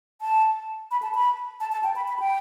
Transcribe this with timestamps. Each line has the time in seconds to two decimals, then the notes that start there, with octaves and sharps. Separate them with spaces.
0.21 A5
0.91 B5
1.02 A5
1.14 B5
1.60 A5
1.72 A5
1.83 G5
1.96 B5
2.08 B5
2.19 G5